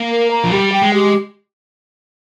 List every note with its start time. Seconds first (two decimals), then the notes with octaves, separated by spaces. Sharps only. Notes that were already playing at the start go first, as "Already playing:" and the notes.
Already playing: A#3
0.11 A#4
0.31 A#5
0.44 F3
0.52 G3 G4
0.73 G5
0.83 G#3
0.94 G4